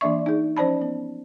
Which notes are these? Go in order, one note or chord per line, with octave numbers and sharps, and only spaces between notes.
E3 A#3 D4 D5 E5 C#6
D#4 G#4
F3 C#4 C5 D5 A5 B5
B3